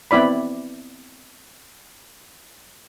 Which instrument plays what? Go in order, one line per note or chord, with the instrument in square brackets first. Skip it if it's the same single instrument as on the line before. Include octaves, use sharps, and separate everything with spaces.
[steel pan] B3 C4 E4 D5 B5